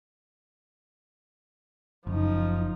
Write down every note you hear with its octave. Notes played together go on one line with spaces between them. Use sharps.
F#1 F3 D#4